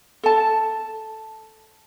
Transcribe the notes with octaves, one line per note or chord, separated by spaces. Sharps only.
A4 A5